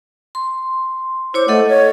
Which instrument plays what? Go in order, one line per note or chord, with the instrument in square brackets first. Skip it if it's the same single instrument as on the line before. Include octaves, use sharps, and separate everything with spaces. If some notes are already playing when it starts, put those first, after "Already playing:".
[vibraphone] C6
[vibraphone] E4 C#5 D6 [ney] C5
[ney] A3 [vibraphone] A4 D#5 F#5
[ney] C#5